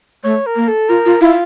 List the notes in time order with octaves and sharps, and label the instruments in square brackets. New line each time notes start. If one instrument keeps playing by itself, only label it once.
[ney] A3 [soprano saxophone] C#5
[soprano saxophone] A#4
[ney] A#3
[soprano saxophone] A4
[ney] F4 [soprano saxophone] A#4
[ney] F4
[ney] E4 [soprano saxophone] F4